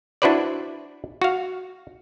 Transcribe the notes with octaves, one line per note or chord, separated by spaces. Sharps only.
D4 E4 F#4 B4 C5 D5
F#4 F5